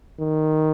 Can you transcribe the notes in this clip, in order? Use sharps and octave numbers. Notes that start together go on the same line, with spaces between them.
D#3